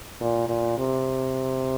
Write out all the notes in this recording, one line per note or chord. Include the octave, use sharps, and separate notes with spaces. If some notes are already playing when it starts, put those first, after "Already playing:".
A#2
A#2
C3